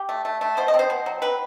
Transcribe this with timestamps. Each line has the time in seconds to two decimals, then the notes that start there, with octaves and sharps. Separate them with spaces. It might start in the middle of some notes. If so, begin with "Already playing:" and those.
Already playing: G4
0.09 A3
0.25 A3
0.41 A3
0.57 B2 C5
0.68 D#5
0.74 C4
0.79 C5
0.90 B2
1.06 F#3
1.22 C4 B4